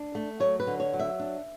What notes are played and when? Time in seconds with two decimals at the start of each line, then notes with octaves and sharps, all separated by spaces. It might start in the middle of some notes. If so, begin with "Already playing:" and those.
Already playing: D4
0.15 A3
0.40 F#3 C#5
0.60 B4
0.67 D3
0.80 C#5
0.93 F#3
1.00 E5
1.20 D4